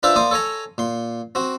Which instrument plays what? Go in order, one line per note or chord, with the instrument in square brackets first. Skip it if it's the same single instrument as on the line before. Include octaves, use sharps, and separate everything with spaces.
[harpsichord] D4 F4 B4 C5 D5 E5
A#3 C5 D5 D#6
A4 C#5 G#5 A#5
A#2 C6
C4 F#4